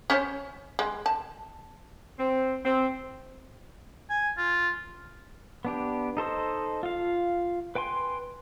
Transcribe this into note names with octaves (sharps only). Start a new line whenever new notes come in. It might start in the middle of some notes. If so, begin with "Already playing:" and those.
C#4 C5 C#5
G#3
A5
C4
C4
G#5
F4
B3 D4 G4
D#4 A4 C5 D#5
F4 F5
B4 G5 G#5 C6